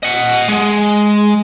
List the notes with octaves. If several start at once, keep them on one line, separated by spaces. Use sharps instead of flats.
D#5 F#5
G#3